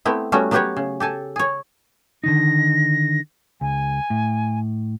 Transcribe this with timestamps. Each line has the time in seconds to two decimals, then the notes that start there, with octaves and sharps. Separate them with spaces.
0.05 A3 B3 C4 E4
0.32 G3 A3 B3 C#4 F#4
0.51 F#3 B3 F#4 G4 B4 C#5
0.76 C#3
1.00 G4 A4 G#5 A5
1.36 G#4 C#5
2.24 D3 D#3 D#4 A#6
3.61 C#2 G#5
4.10 A2